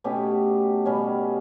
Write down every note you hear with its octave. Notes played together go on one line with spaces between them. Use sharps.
B2 A3 C#4 G4
B2 G3 C#4